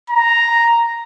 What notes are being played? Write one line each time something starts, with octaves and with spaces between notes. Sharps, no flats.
A#5